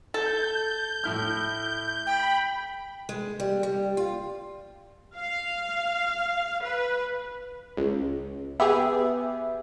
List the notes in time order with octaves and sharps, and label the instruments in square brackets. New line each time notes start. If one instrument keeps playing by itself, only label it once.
[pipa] A4 [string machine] G6
[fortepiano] A2 E4 F6
[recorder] G5 [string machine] B5
[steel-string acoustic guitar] G#3
G3
G3
F4
[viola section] F5
B4
[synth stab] C#2
[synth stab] B3 G4 G#4 [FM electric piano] E5